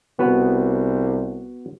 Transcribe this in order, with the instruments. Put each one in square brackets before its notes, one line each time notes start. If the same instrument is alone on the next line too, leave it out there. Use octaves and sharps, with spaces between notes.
[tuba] C2 [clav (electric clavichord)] B3 F#4 B4